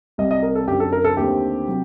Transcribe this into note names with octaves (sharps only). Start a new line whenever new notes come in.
C2 C3 G3 D#5
D#5
A#4
A4
F#2 D3 F#3 C4 G4
A4
A#4
A4
D#2 D3 A3 C4 G4
C3 F#3